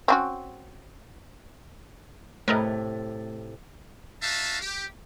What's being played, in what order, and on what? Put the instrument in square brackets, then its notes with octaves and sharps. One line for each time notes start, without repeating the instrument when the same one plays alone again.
[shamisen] C4 C#4 F#4
[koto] A2 C3 [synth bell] A3 [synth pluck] A#4 B4 D#5
[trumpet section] D#4 F#4 E5 F5 A5
G4